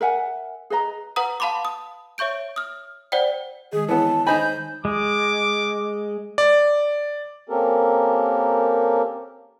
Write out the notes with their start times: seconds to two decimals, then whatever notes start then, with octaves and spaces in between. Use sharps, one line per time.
0.01 A#4 E5 F#5 G#5
0.70 G#4 B4 D#5 A#5
1.16 B4 F#5 A#5 D#6
1.40 F5 A5 B5 C6 D6
1.65 D#6
2.18 C#5 E5 C#6 G6 D7
2.56 D#6 F6
3.12 C5 D5 F#5 G5
3.73 D#3 G#3 G#4
3.89 E3 B3 C#5 A5
4.27 D#4 C5 D#5 G#5 B5 G6
4.85 G#3 D6
6.38 D5
7.49 A#3 C4 C#4 G4 A4 A#4